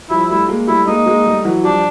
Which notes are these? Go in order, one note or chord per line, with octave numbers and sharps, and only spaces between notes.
F3 G3 E4
G3 A3 E4
G#3 A#3
G3 A3 E4
G#3 A#3 D#4
G#3 A#3
G3 A3
E3 F#3
F3 G3 D4